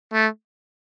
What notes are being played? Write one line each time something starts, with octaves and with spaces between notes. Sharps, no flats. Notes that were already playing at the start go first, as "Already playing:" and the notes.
A3